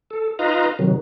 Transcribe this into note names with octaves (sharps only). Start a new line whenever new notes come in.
A4
D#4 F4 B4 D#5 F5 A#5
C3 D#3 F#3